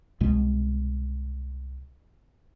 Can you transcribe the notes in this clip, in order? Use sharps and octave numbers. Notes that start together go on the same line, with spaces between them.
C2 B2 G#3